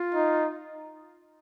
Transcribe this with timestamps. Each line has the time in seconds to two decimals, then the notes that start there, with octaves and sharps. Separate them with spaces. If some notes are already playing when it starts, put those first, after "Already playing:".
Already playing: F4
0.15 D#4